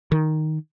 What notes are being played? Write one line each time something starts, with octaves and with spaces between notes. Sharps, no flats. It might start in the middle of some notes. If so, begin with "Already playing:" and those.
D#3